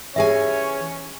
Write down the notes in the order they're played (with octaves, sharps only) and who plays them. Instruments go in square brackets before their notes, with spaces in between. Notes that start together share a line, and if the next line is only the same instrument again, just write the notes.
[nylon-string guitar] E3 G#4 G#5 [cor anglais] C#4 [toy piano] G4 E5 [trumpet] C#5